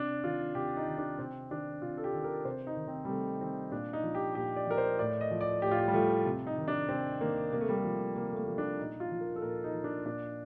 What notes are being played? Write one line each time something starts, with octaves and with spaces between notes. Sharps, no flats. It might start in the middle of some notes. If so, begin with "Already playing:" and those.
Already playing: C3 D4
D#3 F4
C3 G4
D#4
D#3
D4
C3 C4
D#3 D4
C3 F4
A4
G4
D#3
A#4
C3 C5
D#4
D#3
C4
G3
C3 A3
D#3 C4
A#2 D4
D#4
F3
G4
A#2 G4
D5
F3 A#4
C5
A2 D5
D#5
F3
D5
A2 G4
F4
G4
G3
F3 A3
C3
D#4
D#3
D4
C3 C4
D#3 A#3
C3 A#3
A3
G3
A3
F3
C3 A#3
A3
A#3
F3
D4
A#2 D#4
F4
F3
A#4
A4
A#2 A#4
D#4
F3
D4
A#2 D4